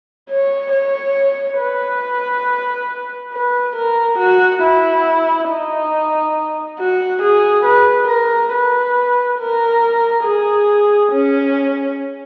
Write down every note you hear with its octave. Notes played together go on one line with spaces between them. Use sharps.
C#5
C#5
B4
B4
A#4
F#4
E4
D#4
F#4
G#4
B4
A#4
B4
A#4
G#4
C#4